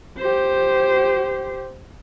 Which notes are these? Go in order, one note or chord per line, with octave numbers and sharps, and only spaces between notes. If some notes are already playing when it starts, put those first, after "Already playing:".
G4 C5